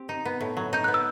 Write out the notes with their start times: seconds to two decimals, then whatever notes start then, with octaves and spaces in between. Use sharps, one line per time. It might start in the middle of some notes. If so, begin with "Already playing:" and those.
Already playing: C4 G4
0.09 D#4
0.25 B3
0.40 A2
0.57 F#3
0.73 D#4 G6
0.84 B3 F#6
0.94 E6